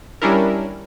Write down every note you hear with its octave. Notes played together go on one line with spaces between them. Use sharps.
G3 C#4 D4 E4 A#4